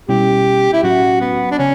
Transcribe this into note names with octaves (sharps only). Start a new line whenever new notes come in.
B2 G3 C#4 E4 G4
E4
A2 F#3 C#4 F#4
B3
D4
C#3 C#4